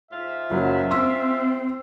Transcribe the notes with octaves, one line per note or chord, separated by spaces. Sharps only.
G#2 F4 E5
F#1 F#3
C4 C6 E6